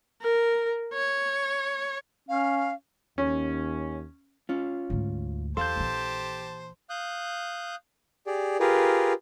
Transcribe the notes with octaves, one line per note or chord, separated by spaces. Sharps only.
A#4
C#5
C#4 F5
D#2 C#4
C#4 F4
D2 G#2
E2 G4 A4 C5 F5 A5 C6 G6
A#1 E3
F5 D#6 F#6 G6
G4 G#4 D5
F4 G4 G#4 A#4 B4